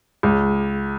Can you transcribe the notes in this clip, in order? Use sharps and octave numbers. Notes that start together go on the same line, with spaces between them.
C#2